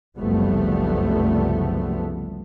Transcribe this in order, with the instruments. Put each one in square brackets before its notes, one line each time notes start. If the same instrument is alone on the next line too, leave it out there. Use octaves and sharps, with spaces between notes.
[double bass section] F#1 C2 F3 G3 A3 B3